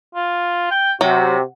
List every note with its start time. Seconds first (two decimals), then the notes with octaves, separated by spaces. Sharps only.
0.15 F4
0.71 G5
1.01 C3 F#3 F#4